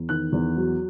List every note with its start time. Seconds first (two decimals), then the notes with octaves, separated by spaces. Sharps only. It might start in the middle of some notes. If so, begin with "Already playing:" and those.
Already playing: E2
0.09 D#3 F#6
0.32 E2
0.56 F#3